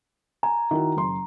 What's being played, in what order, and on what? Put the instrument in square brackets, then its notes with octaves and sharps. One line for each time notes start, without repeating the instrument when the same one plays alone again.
[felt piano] G#5 [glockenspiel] A#5
[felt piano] D#3 E4 F#4
F#1 C6